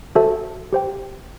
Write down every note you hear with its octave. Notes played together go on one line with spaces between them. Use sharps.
F#4 A4 C5 E5 A5
G4 C5 G5